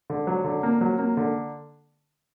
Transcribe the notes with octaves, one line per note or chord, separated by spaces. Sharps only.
D3
F#3
D3
A#3
F#3
A#3
D3